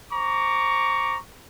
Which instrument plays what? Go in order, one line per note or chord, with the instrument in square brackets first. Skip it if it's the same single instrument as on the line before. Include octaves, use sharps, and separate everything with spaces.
[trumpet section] C5 A#5 C#6 D6